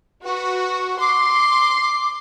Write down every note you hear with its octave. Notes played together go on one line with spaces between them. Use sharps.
F#4 B4
C6 D6